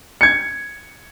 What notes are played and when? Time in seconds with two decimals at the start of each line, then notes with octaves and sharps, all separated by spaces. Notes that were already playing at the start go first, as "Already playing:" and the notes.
0.21 G#6 C#7